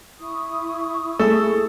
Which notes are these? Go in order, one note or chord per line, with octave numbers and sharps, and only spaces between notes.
E4 C#6 D#6
A3 G#4 A4 E6